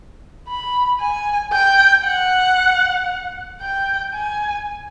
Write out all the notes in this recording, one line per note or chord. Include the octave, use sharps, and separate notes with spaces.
B5
G#5
G5
F#5
G5
G#5